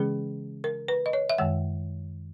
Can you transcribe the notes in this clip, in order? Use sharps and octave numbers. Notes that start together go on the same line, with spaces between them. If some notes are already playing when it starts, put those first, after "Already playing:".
Already playing: C#3 E3 G#3 C#4 G#4
A#4
B4
D#5
C#5
E5
F#2 D#3 G#3 F#5